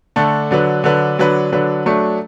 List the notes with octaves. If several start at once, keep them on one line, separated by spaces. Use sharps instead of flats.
D3 A3 D4 A4
D3 F#3 D4 B4
D3 F#3 D4 B4
D3 F#3 D4 B4
D3 F#3 D4 B4
F#3 A3 D4